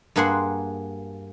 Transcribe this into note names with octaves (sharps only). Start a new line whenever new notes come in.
G2 A#3 G#4 F#5 C6